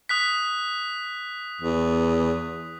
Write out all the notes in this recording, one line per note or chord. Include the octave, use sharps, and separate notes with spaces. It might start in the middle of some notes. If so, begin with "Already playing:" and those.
D#6 F#6 B6
E2